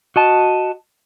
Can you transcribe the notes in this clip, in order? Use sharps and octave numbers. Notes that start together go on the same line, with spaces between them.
F#4 D#5 A5